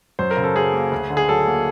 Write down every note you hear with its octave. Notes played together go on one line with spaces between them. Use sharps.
F#2 C5
A#4
C#3
A4
F#3 G#4
A#3
D2
D3
G#4
F#3 A4
A#3